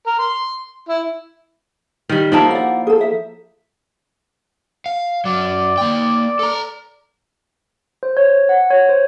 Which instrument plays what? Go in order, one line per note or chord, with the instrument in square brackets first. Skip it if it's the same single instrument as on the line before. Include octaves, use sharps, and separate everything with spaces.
[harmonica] A#4
C6
E4
[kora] D#3 G3
[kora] F3 A#3 E4 [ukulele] D#4 A5
[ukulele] D5 F#5
G#4 A4
E5
[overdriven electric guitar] F5
[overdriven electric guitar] F#2 F#3 [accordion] D5
[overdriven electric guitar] A#3 G5
A4 A#5
[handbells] C5
C#5
F#5
C#5
C5